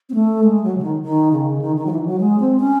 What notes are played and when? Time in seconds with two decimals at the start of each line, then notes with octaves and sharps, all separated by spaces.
0.09 C4
0.14 A3
0.44 G#3
0.64 F#3
0.77 C#3
0.83 D#3
1.03 D#3
1.32 C#3
1.61 D#3
1.76 D#3
1.86 F#3
1.91 E3
2.06 F#3
2.20 G#3
2.40 C4
2.60 C#4